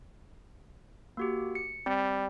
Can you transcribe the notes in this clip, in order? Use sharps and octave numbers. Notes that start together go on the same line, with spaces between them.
A#3 F#4 G4
C#7
G3 C4